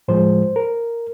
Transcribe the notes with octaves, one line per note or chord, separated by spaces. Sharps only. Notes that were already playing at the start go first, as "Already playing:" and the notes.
A2 F3 G#3 C5
A#4